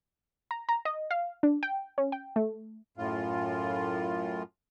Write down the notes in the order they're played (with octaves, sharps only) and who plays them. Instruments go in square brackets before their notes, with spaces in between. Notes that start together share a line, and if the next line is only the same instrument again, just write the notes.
[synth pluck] A#5
A#5
D#5
F5
D4
G5
C#4
G5
A3
[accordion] F#2 A2 F4